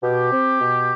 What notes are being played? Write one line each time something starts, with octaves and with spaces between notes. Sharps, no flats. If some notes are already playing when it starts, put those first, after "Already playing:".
B2 G4
C4
B2